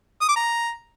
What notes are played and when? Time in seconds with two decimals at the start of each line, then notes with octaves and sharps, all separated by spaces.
0.21 D#6
0.28 D6
0.36 A#5